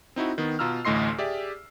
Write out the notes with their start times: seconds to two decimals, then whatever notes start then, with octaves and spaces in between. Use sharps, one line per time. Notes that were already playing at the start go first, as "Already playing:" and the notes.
0.16 C4 D#4 E4 F#4
0.38 D#3 B3
0.59 B2 F4 A#5 E6 F6
0.85 A1 D2 A2 D#5 C6 C7
1.18 G4 G#4 D5 E5